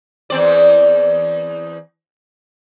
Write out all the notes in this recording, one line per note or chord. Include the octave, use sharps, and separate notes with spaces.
E2 C4 D5